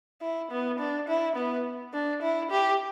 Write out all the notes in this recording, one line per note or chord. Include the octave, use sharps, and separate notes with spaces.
E4
B3
D4
E4
B3
D4
E4
G4